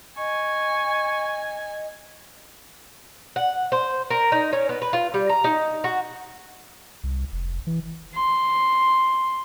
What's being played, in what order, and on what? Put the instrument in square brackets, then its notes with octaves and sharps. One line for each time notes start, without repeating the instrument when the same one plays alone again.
[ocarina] D#5 [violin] G#5 [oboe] C#6
[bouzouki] F#5
C5
A#4
D#4
C#4
B3
B4
F4
G3
A#5
D#4
F#4
[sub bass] C2
F1
E3
[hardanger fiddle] C6